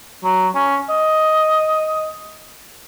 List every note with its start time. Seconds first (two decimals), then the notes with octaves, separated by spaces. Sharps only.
0.24 F#3
0.55 C#4
0.89 D#5